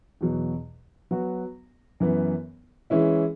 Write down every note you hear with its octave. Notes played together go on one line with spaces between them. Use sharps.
E2 B2 F#3
F#3 B3 F#4
F#2 E3 B3
E3 G#3 C#4 E4